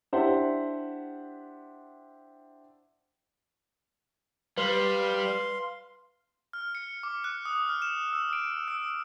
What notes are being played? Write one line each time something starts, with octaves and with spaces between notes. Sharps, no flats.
D4 E4 G4 C5 E5 F#5
G3 B4 F5 C6
F6
C#7
D6
F#6
D#6
F6
E7
E6
D7
E6